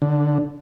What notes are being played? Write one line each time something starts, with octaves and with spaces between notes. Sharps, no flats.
D3